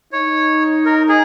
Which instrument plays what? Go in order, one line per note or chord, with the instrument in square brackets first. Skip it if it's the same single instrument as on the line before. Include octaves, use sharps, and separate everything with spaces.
[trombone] D#4 [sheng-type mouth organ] C#5
[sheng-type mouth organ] A#4
G#4